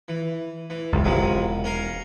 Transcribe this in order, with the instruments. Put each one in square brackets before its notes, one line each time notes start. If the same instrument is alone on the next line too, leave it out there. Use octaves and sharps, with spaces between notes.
[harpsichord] E3
E3
[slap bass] G1 C#2
[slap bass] E1 [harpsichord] C3 F3 F#3
[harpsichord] C#4 A#4 F5